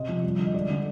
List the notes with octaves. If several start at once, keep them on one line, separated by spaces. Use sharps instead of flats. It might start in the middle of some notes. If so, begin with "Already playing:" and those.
Already playing: C3 C4 D#5
F3
G3
D3
D#5
G#3 D5
D3